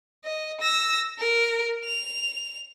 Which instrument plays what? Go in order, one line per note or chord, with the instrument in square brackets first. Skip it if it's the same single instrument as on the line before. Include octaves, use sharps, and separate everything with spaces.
[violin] D#5
E6 A#6
A#4
F7